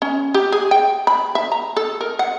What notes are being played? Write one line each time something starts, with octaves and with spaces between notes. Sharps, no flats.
C#4
G4
G#4
G5
B5
E5
A#5
A4
A#4
F#5